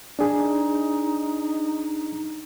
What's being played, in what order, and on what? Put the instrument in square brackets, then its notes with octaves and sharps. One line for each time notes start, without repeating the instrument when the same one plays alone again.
[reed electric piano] D4 G#4 [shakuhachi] D#4